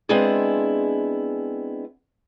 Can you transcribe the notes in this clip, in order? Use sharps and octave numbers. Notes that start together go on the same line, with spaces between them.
G#3 B3 C4 D4 E4 G#4